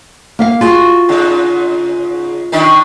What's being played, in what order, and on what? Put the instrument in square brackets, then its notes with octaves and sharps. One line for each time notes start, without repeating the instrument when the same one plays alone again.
[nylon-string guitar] A#3 E5 F5
[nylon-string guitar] F4 G#4 [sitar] F#4
[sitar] G#2 C#3
D#3 D4 D#4